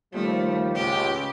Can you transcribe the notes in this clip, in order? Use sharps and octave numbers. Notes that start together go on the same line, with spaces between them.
D#2 F3 G3 A3
C#2 G4